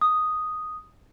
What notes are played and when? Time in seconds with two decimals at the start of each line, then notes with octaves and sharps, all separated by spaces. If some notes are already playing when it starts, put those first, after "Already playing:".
0.01 D#6